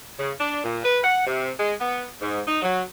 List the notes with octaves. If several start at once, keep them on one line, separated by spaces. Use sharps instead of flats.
C#3
D4
A#2
B4
F#5
C3
G#3
B3
G#2
D#4
F#3